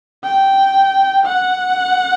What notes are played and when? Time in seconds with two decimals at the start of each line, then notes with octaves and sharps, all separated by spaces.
0.24 G5
1.26 F#5